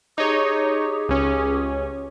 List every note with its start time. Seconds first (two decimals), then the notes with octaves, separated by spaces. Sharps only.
0.18 D#4 G4 G#4 C#5
1.09 C#2 C#4